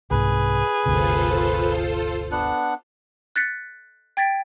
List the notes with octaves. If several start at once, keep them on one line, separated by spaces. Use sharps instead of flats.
C2 G#2 G#4 B4
G1 D2 C3 F4 A4 C5
B3 D4 F#5
F#6 A6 B6 C#7
G5 G#6 A6 B6 D7